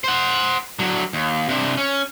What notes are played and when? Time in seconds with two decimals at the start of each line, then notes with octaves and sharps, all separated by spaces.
0.04 C5 F#5
0.79 D3 F#3
1.13 D#2
1.49 C3 D4
1.77 C#4